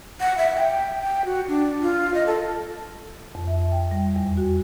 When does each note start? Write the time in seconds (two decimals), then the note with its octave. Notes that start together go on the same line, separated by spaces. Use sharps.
0.21 F#5
0.38 E5
0.56 G5
1.02 G5
1.25 F#4
1.48 D4
1.81 F4
2.14 D#5
2.26 A4
3.35 F2
3.47 E5
3.72 G5
3.91 G3
4.16 E2
4.37 F#4